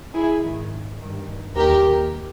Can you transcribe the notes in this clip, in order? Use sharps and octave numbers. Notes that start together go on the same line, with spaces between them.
E4 G#4
G#2 D#3
G2 D#3
D#2 D#3 G4 A#4